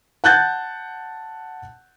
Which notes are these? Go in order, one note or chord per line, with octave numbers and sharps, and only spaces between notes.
F#5 A5 F#6 G6 A6